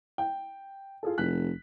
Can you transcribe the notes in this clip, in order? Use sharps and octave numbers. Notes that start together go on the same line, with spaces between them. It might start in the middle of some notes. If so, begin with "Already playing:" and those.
G5
F4 G#4 A4
F1 F#6 B6